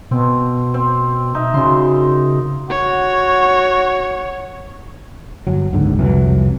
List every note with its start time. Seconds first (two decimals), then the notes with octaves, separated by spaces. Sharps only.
0.11 B2 C4
0.74 C4
1.35 D#4 E5
1.54 F#2 C#3 C6
2.70 F#4 C#5
5.47 G1 F#3
5.73 F#1 C#2 G#2 D3
5.99 C2 F2 E3 F#3